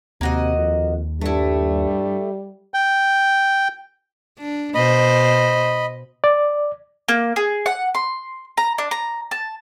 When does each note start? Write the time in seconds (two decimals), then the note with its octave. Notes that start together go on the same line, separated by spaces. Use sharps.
0.21 D#2 C3 A#3 F#4 D#5
0.58 F2
1.21 G2 G3 A3 E4
2.74 G5
4.39 D4
4.75 B2 C5 D#5 B5
6.24 D5
7.08 A#3
7.36 G#4
7.66 F#5
7.95 C6
8.57 A#5
8.78 D4
8.91 A#5
9.31 A5